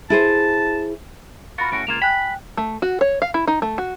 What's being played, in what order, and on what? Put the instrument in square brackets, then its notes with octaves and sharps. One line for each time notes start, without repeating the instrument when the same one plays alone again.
[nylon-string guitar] E4 G#4 C5 [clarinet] A5
[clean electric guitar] F4 F#4 A#4 [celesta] B5 A6
[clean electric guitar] A2 C#4 F#4 [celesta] D7
[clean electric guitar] C#2 A#3 F4 [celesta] G#6 E7 F7
[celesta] G5 G#5 F#6 [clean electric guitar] B5
[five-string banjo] A3
F#4
C#5
F5
E4
D#4
A3
F#4